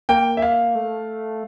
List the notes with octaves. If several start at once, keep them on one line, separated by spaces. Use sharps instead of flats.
A#3 G5
E5
F5
A3